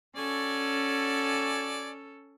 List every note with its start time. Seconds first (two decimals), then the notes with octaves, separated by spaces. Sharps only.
0.16 C#4 F#4 A4 D5 G#5